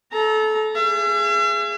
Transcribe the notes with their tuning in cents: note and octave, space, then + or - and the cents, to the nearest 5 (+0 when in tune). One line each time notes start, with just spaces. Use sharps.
A4 -25 A#5 +10
G#4 +0 E5 +45